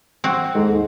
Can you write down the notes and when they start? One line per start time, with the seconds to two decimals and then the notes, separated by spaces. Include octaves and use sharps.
0.24 C4 F#4
0.55 D#2 G#2 A4